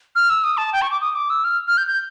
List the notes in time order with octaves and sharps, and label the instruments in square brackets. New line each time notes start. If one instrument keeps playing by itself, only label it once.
[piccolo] F6
E6
D#6
A5
G5
C#6
D6
D#6
D6
E6
F6
F6
G6
G6